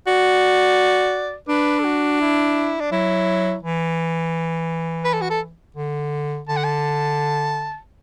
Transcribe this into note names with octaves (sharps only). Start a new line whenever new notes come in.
F#4 D5
D4 B4
A4
F#4
E4
D4
F#3 E4
E3
B4
A4
F#4
A4
D3
D3 A5
F#5
A5